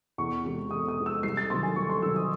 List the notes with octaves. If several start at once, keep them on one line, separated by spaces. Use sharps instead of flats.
E2 C#6
C3 E3 G#3
E2 D#6
D#6
C3 E3 G#3
E6
C2 C7
A6
C3 D#3 F#3 C6
G#5
C2 C#6
C6
C3 D#3 F#3 E6
D#6